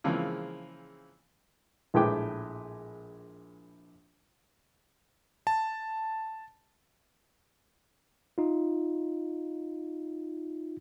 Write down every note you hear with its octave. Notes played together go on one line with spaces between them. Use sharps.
C#3 E3 F3 G#3 A#3 C4
A#1 A2 G#3 B4 G5 D6
A5
D#4 F4